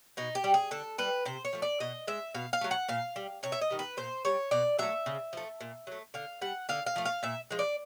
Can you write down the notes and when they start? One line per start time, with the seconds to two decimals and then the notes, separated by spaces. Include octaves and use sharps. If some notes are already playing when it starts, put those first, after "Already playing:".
0.17 B2 D#4
0.35 G4
0.44 G3
0.54 G#4
0.71 D3 A4
0.98 G3 B4
1.25 C3 C5
1.45 C#5
1.53 F3 A3
1.62 D5
1.80 B2 D#5
2.07 G#3 E5
2.34 B2 F5
2.53 F5
2.61 F#3 A3
2.71 F#5
2.88 A#2 F5
3.16 G3
3.43 C3 C#5
3.52 E5
3.61 D#5
3.70 D#3 G3
3.79 B4
3.97 A#2 C5
4.25 G3 C#5
4.51 B2 D5
4.79 F#3 A3 E5
5.06 C#3
5.33 F3 A3
5.61 A#2
5.87 F#3 A3
6.14 D3 F5
6.41 G3 F#5
6.69 D3 F5
6.86 F5
6.96 F3 A3
7.05 F5
7.23 A#2 E5
7.51 F3 G#3
7.59 D5